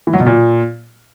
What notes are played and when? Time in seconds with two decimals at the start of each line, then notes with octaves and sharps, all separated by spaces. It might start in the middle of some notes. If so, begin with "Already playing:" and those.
0.07 E3
0.14 F#3
0.20 B2
0.26 A#2